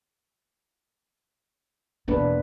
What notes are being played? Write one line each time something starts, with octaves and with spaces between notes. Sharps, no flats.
E2 B2 A#3 D4 B4